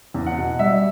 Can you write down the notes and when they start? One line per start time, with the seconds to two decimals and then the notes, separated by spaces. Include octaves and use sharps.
0.14 E2
0.26 F#5
0.38 B2
0.59 G3 E5